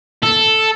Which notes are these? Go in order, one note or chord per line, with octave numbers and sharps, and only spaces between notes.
A4